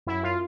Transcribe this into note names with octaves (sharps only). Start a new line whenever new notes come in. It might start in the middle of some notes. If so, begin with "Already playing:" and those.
F#2 E4
F4